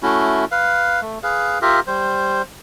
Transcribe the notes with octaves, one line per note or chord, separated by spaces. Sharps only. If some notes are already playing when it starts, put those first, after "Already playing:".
A3 C#4 E4 F#4
B4 F5
A3
G#4 B4 F5
F4 G4 A#4 E5
G3 C5